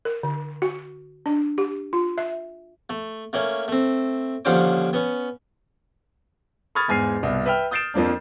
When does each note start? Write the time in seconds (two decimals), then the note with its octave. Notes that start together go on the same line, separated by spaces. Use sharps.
0.05 A#4
0.23 D3
0.62 F#4
1.26 D4
1.58 G4
1.93 F4
2.18 E5
2.90 A3
3.33 A3 A#3 C#4
3.68 A3 C4
4.45 D#2 D3 F3 C#4 C5 D6
4.93 B3 C#4
6.75 B5 C#6 D#6 F6 G#6 A6
6.88 E2 G#2 G#5 F6 C7
7.23 C2 B2
7.46 B4 E5 G5 F6
7.71 D#6 G6 A6 C7 D7 E7
7.94 F2 F3 A#3 D4